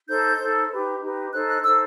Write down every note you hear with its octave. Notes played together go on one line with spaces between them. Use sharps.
D#4 A4 C5 G6
D#4 A4 C5
D#4 G4 B4
D#4 G4 B4
D#4 A4 C5 F#6
F#6
D#4 A4 C5 E6